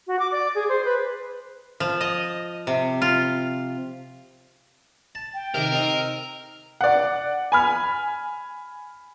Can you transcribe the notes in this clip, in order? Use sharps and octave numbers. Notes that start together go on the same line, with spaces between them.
F#4
D6
D5
G#4
C5
B4
F3
D#5
C3
F4
A5
G5
C3 D#3 G4 A#4
C4 D#4
D5 F#5
G#5 B5 F6